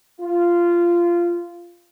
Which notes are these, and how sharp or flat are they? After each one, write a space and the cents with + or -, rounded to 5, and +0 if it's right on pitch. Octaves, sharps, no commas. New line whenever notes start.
F4 -15